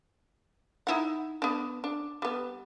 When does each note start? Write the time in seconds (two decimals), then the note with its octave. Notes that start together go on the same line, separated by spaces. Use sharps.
0.87 D#4 E4 F#5
1.42 B3 D4
1.84 D4
2.22 G3 B3